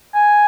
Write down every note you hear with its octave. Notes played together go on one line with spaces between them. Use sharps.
G#5